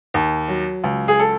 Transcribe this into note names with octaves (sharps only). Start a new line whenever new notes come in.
D#2
F#3
C#2
G#4
A4